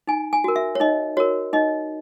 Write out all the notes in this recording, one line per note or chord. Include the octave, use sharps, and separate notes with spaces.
D#4 G#5
G#5
F#4 A#4
E5
C#5
D#4 D#5
F#4 A#4 C#5
D#4 D#5